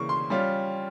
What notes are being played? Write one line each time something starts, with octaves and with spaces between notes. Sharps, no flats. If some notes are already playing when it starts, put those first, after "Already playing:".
Already playing: C#3 E3 A#3 C#6
C6
G3 C#4 F4